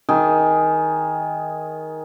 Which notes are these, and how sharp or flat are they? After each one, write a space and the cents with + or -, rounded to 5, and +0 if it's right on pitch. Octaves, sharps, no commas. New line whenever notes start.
D#3 +15 G#4 +0